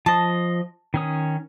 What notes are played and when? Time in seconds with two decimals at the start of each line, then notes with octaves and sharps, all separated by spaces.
0.06 F3 D#5 A5
0.94 D#3 C#4 D#6